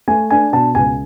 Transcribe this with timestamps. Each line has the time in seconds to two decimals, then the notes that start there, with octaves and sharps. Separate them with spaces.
0.08 A3 G#5
0.30 D4 G#5
0.53 B2 A5
0.75 C#2 G#5